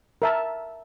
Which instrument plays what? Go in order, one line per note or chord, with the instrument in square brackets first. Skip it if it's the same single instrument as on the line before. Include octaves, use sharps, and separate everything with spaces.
[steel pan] A#4 E5 A5